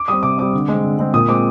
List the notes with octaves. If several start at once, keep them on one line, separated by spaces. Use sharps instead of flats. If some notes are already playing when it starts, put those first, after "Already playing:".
Already playing: D6
G3 C4 D#6
C3 D6
G3 C4 D6
D3
G#3 C4
D3
G#3 C4
A#2 D#6
G#3 C4 D6